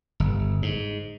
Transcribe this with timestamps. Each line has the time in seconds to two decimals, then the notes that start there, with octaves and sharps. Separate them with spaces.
0.20 G1
0.62 G#2